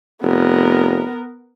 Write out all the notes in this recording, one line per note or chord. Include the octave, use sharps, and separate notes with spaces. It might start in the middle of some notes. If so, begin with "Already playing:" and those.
F1 B3 A#4